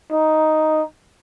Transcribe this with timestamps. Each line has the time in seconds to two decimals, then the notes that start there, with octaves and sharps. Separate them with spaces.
0.12 D#4